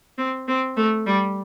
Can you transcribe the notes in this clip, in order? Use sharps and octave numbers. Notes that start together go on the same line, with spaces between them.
C4
C4
A3
G3